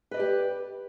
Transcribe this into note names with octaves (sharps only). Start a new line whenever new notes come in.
G4 B4 D5 D#5